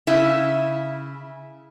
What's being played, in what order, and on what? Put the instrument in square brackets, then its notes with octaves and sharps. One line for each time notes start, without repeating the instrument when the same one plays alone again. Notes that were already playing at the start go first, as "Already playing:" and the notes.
[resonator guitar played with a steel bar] C#3 E4 E5